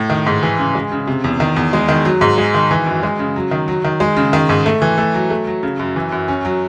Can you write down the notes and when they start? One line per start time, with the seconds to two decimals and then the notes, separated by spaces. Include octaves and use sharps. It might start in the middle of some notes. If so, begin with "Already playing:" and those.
Already playing: A2
0.10 D#3
0.26 G#2
0.43 E3
0.59 C#3
0.75 G#3
0.92 C#3
1.07 C3
1.24 E2
1.40 D#3
1.56 E2
1.73 G#3
1.88 D#3
2.05 F#3
2.21 G#2
2.38 G#3
2.54 D#3
2.71 E3
2.86 F#2
3.03 G#3
3.19 C#3
3.36 F#3
3.51 D#3
3.68 F#3
3.84 D#3
4.00 G#3
4.17 C#3
4.33 D#3
4.49 G#2
4.66 A3
4.82 E3
4.98 A3
5.14 F#3
5.30 A3
5.47 F#3
5.63 C#3
5.79 F#2
5.96 E3
6.12 F#2
6.28 C#4
6.45 F#3